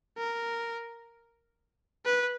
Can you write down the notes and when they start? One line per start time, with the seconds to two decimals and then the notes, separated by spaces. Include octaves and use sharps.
0.18 A#4
2.05 B4